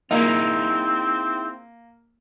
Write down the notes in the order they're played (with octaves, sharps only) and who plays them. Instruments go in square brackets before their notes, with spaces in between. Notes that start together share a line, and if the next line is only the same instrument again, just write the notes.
[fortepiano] A#3 [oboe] C4 [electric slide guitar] D#4 E4 G#4